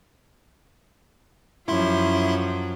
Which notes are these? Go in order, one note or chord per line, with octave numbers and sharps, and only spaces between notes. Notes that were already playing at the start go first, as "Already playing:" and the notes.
F#2 F3 E4 E5 C6